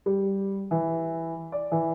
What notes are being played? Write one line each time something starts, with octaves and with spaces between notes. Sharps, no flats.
G3
E3
D5
E3